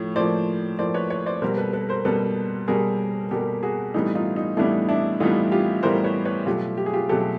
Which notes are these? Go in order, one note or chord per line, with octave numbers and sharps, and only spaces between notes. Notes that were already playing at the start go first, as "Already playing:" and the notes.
Already playing: A2 F3 C#5
A2 F3 A#3 C5 D5
A2 F3 A#3 C5 D5
B4 C#5
B4 C#5
C5 D5
B2 G3 A#3 A#4 C5
A4 B4
A4 B4
A#4 C5
B2 G3 A#3 A4 B4
B2 G3 A#3 G#4 A#4
B2 G3 A#3 G4 A4
F#4 G#4
A2 E3 G3 B3 D#4
D#4 F4
D#4
A2 E3 G3 B3 D4 E4
D4 E4
A2 E3 G3 B3 D#4 F4
F4 G4
A2 E3 G3 B3 A#4 C5
B4 C#5
B4 C#5
B2 F#3 A3 F4 G4
G4
G#4
F4 G4
B2 F#3 A3 G4 A4